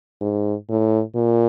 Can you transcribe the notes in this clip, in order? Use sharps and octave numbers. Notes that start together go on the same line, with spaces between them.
G#2
A2
A#2